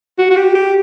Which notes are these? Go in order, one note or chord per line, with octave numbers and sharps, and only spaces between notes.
F#4
F#4
G4
G4